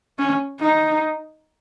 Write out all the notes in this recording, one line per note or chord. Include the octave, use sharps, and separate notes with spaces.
C#4
D#4